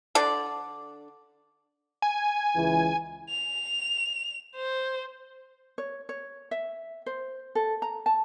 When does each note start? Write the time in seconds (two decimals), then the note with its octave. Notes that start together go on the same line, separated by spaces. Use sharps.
0.15 D3 D4 A4 D5
2.02 G#5
2.56 C#2 E3
3.30 F7
4.56 C5
5.78 C#5
6.09 C#5
6.51 E5
7.06 C5
7.55 A4
7.82 A#5
8.06 A5